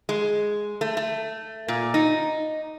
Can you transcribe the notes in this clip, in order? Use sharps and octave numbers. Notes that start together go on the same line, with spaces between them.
G#3
A3
A3
A#2
D#4